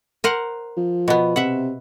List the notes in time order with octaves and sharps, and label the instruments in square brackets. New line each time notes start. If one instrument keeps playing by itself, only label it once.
[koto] A#4 C5 F#5
[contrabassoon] F3
[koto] B2 B3
[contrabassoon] C3 [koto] E5 F#5